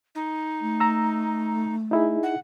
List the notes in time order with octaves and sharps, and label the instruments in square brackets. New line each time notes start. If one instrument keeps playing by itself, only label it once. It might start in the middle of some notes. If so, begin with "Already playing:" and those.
[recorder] D#4
[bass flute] A3
[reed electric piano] A#5 E6
D#4 E4 G#4
[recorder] F#5